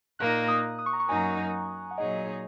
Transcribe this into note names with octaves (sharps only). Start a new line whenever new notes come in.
A#2 A#3 D#4 F#6
D#6
D#6
C#6
A#5
C#6
F#2 F#3 A#3 D#4 F#4 G#5
A#5
G#5
F#5
A#2 F#3 D#4 G#4 C#5 D#5